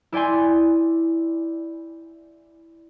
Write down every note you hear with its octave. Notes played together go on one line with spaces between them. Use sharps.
E4 D5 G5 G#5 C6